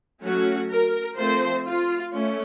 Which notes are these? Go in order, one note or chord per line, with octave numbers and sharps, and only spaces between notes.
F#3 A3 C#4 F#4
A#4
F3 A3 C4 C5
F4
A3 C#4